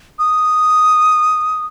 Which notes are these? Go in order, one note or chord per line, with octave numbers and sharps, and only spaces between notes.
D#6